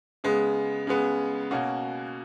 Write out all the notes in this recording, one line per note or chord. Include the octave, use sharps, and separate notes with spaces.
C#3 G#3 B3
C#3 G#3 B3
B2 A#3 C#4 F#4